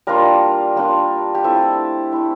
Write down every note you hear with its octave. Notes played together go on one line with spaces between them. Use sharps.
G3 A#3 D4 F4 A#4
G3 A#3 D4 F4
G4
A3 C4 E4 A4
A3 C4 E4